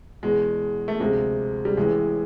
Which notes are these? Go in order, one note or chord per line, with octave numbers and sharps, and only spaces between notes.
E2 B2 G#3
A3
D2 C3 F3 G#3
G3
A1 A2 E3 G#3